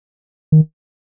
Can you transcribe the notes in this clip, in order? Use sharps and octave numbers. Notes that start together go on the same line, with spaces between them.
D#3